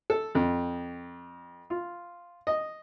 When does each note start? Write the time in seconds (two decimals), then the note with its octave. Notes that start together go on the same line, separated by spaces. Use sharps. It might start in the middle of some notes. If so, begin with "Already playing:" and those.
0.10 A4
0.35 F2
1.70 F4
2.47 D#5